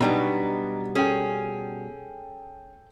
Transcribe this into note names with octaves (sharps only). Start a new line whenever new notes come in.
B2 F#3 G3 B3 D4 D#4 A#5
C#4 G#4 A4 G5